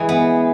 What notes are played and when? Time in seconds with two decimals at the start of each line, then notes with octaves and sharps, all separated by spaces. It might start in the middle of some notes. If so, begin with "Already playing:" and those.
Already playing: E3 G#3
0.09 B3